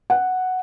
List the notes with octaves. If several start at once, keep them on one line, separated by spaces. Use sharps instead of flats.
F#5